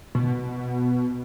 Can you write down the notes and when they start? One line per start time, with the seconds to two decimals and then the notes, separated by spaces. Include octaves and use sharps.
0.15 B2